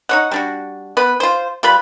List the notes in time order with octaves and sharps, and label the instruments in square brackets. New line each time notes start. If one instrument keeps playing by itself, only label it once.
[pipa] D#4 C#5 F#5
G3 D4 F#4
B3 B4
F4 C5
G3 F4 B4 B5